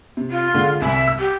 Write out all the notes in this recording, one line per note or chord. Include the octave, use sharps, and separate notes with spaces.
C3
F4
D3 G#3
C2 E5 G#5
E6
G4